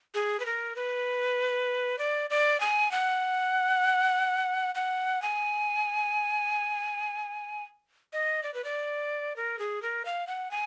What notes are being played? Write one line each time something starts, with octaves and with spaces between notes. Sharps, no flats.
G#4
B4
A#4
B4
D5
D5
G#5
F#5
F#5
G#5
D#5
D5
B4
D5
A#4
G#4
A#4
F5
F#5
G#5